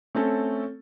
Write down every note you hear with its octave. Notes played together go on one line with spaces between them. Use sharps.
A3 C4 C#4 A4